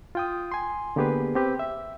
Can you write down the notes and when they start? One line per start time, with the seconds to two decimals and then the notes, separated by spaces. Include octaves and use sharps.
0.15 F4 G5 D#6
0.52 G#5 C6
0.96 D3 A#3 B3 G4 G#4 B4
1.35 C4 G4 B4
1.59 E5